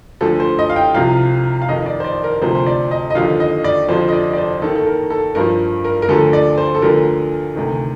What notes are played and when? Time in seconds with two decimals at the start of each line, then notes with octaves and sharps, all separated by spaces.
0.21 D2 D3 F3 A4
0.40 C5
0.59 D#5
0.70 F5
0.76 G5
0.95 C2 C3 F3 F5
1.62 F5
1.68 F2 D#3 D#5
1.86 D5
2.00 C5
2.04 D5
2.24 A#4
2.42 D2 C3 F3 C5
2.55 C5
2.66 D5
2.91 D#5
3.10 D#5
3.15 D#2 D3 F3 F5
3.40 D#5
3.64 D5
3.88 F2 D3 F3 C5
4.08 D#5
4.13 D5
4.33 D5
4.37 C5
4.61 D#2 D#3 A4
4.75 A4
4.87 A#4
5.10 A4
5.35 G2 F3 A#4
5.84 A#4
6.02 A#4
6.09 D2 D3 F3 A4
6.33 D5
6.58 C5
6.75 A4
6.82 D2 D3 F3 A#4
7.55 D2 C3 D#3